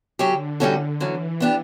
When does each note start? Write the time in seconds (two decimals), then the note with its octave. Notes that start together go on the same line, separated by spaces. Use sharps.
0.19 D3 F#3 C#4 G4
0.60 A2 G3 C#4 F#4 A4
0.99 D3 E3 F#3 C#4
1.40 B3 D4 G4